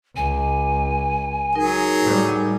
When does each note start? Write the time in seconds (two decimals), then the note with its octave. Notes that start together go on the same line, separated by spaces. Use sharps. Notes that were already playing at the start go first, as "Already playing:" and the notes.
0.16 C#2 G#5
1.55 F#3 D#4 G#4 A#4
2.02 A2 G3